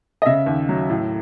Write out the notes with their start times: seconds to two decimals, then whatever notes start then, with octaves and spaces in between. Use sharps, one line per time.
0.22 D#5
0.26 C#3 E5
0.46 D#2
0.69 F#3
0.90 A2